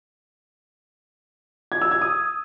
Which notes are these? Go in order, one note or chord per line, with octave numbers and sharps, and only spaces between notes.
G#6
E6
G#6
D#6